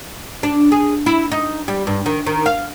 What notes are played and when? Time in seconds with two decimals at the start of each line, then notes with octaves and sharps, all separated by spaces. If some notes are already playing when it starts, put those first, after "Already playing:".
0.43 D4
0.72 G#4
1.06 E4
1.32 D#4
1.68 G3
1.87 G2
2.06 D#3
2.26 D#3
2.46 F5